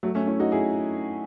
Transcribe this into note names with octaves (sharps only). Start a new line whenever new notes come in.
F#3 A3
A3 C#4
C#4 E4
D#4 F#4
E4 G#4